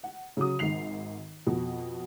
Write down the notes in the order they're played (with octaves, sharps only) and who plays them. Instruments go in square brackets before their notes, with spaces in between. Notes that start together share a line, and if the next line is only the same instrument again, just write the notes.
[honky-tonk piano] F#5
C#3 F#3 D#6
G#1 G#2 D#3 C7 F7
F2 B2